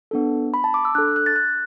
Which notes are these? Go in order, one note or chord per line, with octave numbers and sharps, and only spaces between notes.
B3 D4 A4
B5
A5
D6
E6
D4 A4 F#6
F#6
A6
F#6